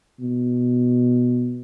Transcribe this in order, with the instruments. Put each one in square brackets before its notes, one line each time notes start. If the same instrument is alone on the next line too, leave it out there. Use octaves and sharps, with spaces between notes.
[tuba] B2